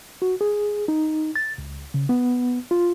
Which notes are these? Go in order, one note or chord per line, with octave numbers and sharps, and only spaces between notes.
F#4
G#4
D#4
A6
C#2
C#3
B3
F4